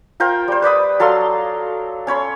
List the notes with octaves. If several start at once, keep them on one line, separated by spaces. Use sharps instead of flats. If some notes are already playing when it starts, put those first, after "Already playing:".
F4 A#4 C5 G5
G3 C5
B4 D5 B5 D#6
F#3 A4 F5 C6
C#4 C#5 B5 C6